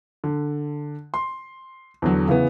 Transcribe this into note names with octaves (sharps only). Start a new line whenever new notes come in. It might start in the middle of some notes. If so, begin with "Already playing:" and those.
D3
C6
E2 D3 F#3
C#3 E3 B3